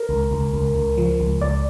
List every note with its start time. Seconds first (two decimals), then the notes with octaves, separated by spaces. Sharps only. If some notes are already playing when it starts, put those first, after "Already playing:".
Already playing: A#4
0.09 C#2
0.31 C#2
0.53 C#2
0.75 C#2
0.97 F3
1.20 C#2
1.41 C#2 D5